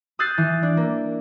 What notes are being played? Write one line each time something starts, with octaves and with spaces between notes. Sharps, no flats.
D#6 E6 F#6 G6 A6 C7
E3
D4
A#3